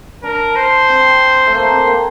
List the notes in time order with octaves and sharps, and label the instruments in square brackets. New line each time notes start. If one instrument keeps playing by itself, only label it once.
[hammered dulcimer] D4 [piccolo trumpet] A#4
[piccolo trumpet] C5
[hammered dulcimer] C4
A3
[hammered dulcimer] A#3 [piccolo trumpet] C5
[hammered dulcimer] C4
A#3